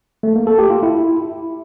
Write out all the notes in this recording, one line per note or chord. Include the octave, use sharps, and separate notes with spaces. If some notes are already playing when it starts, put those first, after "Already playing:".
A3
A#3
A4
G4
F4
E4